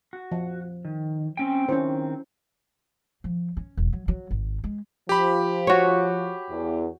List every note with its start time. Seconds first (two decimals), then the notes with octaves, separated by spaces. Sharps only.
0.13 F#4
0.32 F3
0.85 D#3
1.37 C4 C#4 G5
1.69 D#3 C4 C#4 E4 C5
3.24 F3
3.57 C#4
3.77 E1
3.93 F#3
4.08 F#3
4.31 G#1
4.64 G#3
5.09 F3 G4 B5
5.67 F#4 C#5
6.50 E2